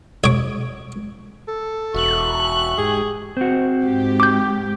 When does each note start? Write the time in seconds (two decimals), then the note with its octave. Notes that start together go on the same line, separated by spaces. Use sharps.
0.24 C#5 D6
1.48 A4
1.94 E1 F#4 E5 C#6 F#6
2.78 G#2 G4 G#4 G#5
3.37 C4 F#4
3.83 G#2 G4
4.20 D6 G6